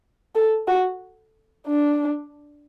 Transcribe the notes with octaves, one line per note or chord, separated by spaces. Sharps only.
A4
F#4
D4